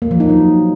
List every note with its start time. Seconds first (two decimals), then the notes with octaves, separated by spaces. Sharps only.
0.02 A#3
0.11 F3
0.20 D#4
0.29 F#3